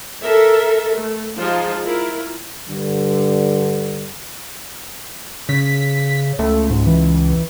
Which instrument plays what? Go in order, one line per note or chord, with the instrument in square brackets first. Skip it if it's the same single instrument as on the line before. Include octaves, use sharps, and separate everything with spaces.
[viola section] A4 A#4 E5
A3
F3 G#3 D#4 F4 G#4 A5
E4 F4 A#4
[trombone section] G2 D3
[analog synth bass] C#3 [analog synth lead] B6
[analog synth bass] C#2 [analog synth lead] A3
[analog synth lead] G#2
E3